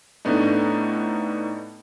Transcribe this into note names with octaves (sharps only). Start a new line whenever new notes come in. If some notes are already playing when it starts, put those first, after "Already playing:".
A2 A3 B3 D4 D#4